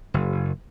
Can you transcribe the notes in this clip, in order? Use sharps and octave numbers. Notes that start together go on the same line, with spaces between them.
F#1